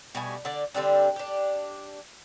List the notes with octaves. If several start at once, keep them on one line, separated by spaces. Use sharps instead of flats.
B2 G3 A3 G#5
D3 D5
D3 G3 C4 D4
D4 G4